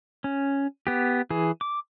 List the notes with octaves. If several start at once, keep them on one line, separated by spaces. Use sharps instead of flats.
C#4
B3 G4
E3 G#4
D6